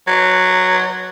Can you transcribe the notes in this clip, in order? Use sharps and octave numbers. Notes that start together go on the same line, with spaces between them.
F#3